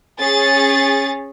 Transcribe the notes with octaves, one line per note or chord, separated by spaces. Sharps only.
C#4 G#4 A6